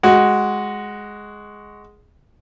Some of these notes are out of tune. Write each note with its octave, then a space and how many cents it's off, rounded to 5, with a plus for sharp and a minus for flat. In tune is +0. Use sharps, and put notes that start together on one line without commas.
G#3 +0 F#4 +0